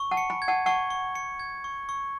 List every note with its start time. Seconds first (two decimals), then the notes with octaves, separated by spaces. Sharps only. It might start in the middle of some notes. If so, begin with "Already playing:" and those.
Already playing: C#6
0.11 F#5 A5
0.17 C#7
0.30 G#5 B5
0.42 G#6
0.48 F#5 A5
0.66 F#5 A5 C#6
0.90 C#6
1.15 C#7
1.40 G#6
1.64 C#6
1.89 C#6